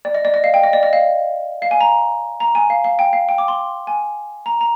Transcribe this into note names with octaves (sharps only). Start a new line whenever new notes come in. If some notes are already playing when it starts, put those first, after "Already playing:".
D5
D#5
D5
D#5
F5
G5
D#5
D5
D#5
F5
F5
G#5
A#5
A#5
G#5
F5
F5
G5
F5
G5
D6
C6
G#5
A#5
A#5